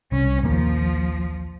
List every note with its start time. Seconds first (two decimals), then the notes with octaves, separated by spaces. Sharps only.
0.12 C2 C#4
0.43 A#1 D#2 F3 A#3